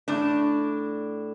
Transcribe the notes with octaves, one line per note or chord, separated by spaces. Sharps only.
A2 D4